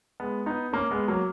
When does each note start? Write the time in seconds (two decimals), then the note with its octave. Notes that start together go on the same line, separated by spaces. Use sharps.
0.20 G#3 B3
0.46 B3 D#4
0.73 A#3 C#4
0.91 G#3 B3
1.08 F#3 A#3